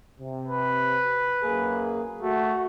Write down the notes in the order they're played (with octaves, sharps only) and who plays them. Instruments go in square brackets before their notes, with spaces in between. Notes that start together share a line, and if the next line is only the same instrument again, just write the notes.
[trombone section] C3
[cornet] B4
[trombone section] F#2 A#3 G#4
[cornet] A3 [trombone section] F#4